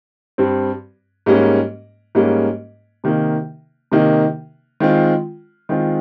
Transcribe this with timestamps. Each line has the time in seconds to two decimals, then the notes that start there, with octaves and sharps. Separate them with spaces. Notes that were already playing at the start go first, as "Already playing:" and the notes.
0.38 G2 G3 C4
1.26 G#2 G3 A#3 C#4
2.15 G#2 G3 A#3 C#4
3.04 C3 D#3 A#3 D#4
3.92 C3 D#3 A#3 D#4
4.80 D#3 G#3 C4 F4
5.69 D#3 G#3 C4 F4